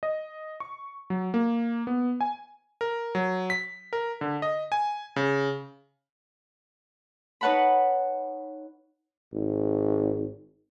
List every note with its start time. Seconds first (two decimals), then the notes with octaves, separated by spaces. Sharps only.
0.03 D#5
0.60 C#6
1.10 F#3
1.34 A#3
1.87 B3
2.21 G#5
2.81 A#4
3.15 F#3
3.50 B6
3.93 A#4
4.21 D3
4.42 D#5
4.72 G#5
5.16 C#3
7.41 D#4 B4 C#5 F#5 A5 B5
9.33 G#1